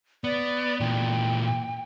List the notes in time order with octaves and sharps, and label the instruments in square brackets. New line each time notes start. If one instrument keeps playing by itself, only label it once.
[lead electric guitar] B3 [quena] D5
[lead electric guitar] A#2 E3 [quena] G5